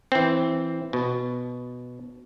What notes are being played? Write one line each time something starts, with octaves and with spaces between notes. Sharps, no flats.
E3 C4
B2